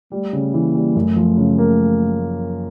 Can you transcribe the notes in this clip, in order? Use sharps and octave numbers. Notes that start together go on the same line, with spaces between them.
G3 A3
C#3
E3 A#3
G3
F#2 A3
F3
C#3
A#3